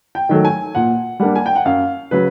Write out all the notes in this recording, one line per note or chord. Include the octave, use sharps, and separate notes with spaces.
G5
D#3 F#3 A3
G#5
A#2 F#5
G3 A#3 D4 F#5
G#5
G5
F#5
F#2 F5
C#3 F#3 B4